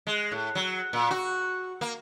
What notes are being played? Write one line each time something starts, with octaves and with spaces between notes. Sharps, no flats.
G#3
A2
F#3
A#2
F#4
A#3